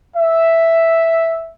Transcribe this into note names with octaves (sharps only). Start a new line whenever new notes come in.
E5